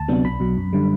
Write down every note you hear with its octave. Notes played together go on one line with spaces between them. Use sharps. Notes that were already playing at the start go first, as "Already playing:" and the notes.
Already playing: D2 A5
C3 F#3 B3 D4
B1 B5
B2 F#3
F#2
D3 G3